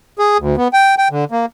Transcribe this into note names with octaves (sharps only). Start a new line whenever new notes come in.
G#4
D2
B3
G5
G5
D3
A#3